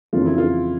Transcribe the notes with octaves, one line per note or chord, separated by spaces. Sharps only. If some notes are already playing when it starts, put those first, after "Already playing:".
F2 C#3 E3 F4
E4
F4